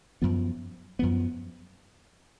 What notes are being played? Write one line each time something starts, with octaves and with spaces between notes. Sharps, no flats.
F#2 F3 B3
F#2 F3 B3